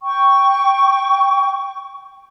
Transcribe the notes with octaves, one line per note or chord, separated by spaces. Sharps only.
G5 C#6